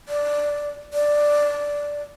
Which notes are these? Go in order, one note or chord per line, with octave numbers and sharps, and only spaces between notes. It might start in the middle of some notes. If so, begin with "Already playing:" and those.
D5
D5